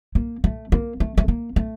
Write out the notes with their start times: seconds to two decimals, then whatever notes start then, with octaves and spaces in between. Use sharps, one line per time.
0.15 A#3
0.44 A3
0.72 A#3
1.00 A3
1.17 A3
1.28 A#3
1.56 A3